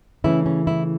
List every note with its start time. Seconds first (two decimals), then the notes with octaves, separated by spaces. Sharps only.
0.24 C#3 E3 A3 C#4 E4
0.46 C#4
0.67 E4